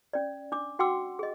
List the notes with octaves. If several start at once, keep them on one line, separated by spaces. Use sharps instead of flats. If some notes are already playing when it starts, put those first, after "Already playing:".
C#4 D5
D4 D6
F#4 F#5 G5 C6 D6 E6
G#4 D#5